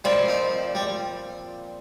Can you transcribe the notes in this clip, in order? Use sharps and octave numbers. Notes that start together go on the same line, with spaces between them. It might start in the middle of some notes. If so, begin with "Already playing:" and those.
A#2 F3 G3 C4
D#4
G3